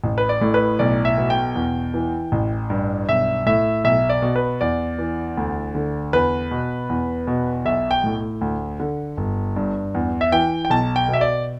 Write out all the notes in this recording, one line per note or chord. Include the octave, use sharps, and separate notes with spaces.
A1
B4
D5
A2
B4
B1 D5
E5
B2
G5
E2
E3
A1
G2
B1 E5
A2 E5
B1 E5
D5
B2
B4
E2 D5
E3
D2
D3
E2 B4
B2
E2
B2
B1 E5
G5
A2
D2
D3
G1
G2
E2
E5
E3 G5
G5
B1 A5
G5
B2
E5
D5